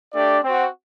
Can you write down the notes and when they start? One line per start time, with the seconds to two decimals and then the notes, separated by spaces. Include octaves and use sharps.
0.13 A3 D4 G4 D5
0.43 C4 F#4